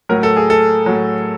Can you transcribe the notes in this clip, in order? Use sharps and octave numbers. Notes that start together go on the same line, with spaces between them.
A2 F#3 A#4
A4
G#4
A4
A2 F#3